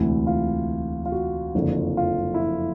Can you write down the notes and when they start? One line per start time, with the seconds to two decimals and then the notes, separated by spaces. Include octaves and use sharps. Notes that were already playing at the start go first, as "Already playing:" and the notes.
Already playing: E1 D2 C3 E3 E4
0.27 F4
1.06 F4
1.12 F#4
1.55 F#1 F2 D3 F3
1.97 F4
2.34 E4
2.40 F4